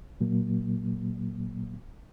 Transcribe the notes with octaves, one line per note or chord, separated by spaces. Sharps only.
A#2 F#3 A#3